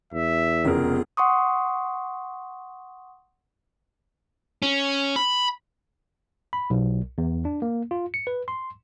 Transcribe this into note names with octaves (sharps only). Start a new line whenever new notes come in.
E2 E5
F1 C#3 B3 F4 G#4 A#4
F#5 C6 C#6 D#6
C#4
B5
B5
B1
E2
D4
A#3
F4
C#7
B4
C6